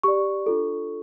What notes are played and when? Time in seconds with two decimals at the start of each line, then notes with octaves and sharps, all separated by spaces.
0.03 G4 D5 C#6
0.46 D4 F4 A4